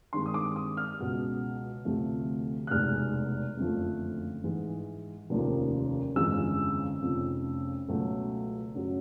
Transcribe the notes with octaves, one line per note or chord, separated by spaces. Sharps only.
G2 D#3 G#3 C4 C6
D#6
D6
D#6
F6
C#2 B2 G#3
D2 C3 F3 A3
F#6
F1 E2 B2 G#3 F6
F#1 F2 D3 F3 A3
G#2 E3 G#3
F1 D#2 C#3 F3 A#3
G1 F2 C#3 E3 G#3 E6
F1 F2 C#3
C#2 B2 F#3 A3
F#2 C#3 F#3